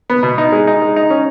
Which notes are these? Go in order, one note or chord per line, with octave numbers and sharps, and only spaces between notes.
B3
B2
D#4
G#3
D#4
G#3
D#4
C#4